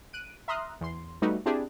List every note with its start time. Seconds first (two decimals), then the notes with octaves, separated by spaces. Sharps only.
0.13 F#6 D7 D#7
0.48 E5 A#5 C6 D#6 F6 F#6
0.81 E2 C6
1.22 G3 A3 B3 D#4 F#4
1.46 C4 D4 E4 G4 G#4